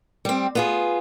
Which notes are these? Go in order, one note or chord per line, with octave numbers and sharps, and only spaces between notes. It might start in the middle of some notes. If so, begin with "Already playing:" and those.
G3 C4
B3 F4 G#4